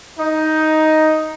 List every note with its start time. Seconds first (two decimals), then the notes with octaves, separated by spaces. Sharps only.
0.18 D#4